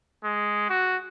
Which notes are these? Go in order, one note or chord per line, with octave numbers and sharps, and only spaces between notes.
G#3
F#4